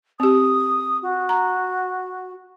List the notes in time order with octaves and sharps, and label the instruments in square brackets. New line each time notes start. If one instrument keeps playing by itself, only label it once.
[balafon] C4 G4 [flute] D#6
[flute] F#4
[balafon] A#5